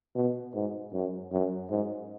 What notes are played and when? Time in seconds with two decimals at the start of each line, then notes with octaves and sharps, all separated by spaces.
0.15 B2
0.55 G#2
0.93 F#2
1.33 F#2
1.70 G#2